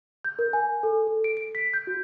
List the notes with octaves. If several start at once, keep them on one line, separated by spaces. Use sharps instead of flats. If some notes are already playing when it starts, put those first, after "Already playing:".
G6
A#4
G#5
A4
A4
D7
D7
B6
G6
F#4